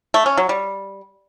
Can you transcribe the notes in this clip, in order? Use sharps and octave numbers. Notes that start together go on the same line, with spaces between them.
A3
C#4
F#3
G3